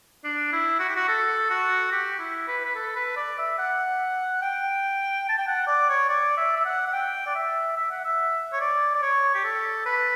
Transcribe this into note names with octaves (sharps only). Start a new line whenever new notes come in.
D4
E4
F#4
G4
F#4
A4
F#4
G4
E4
B4
B4
A4
B4
D5
E5
F#5
G5
A5
G5
F#5
D5
C#5
D5
E5
E5
F#5
F#5
G5
D5
E5
E5
F#5
E5
C#5
D5
D5
C#5
G4
A4
B4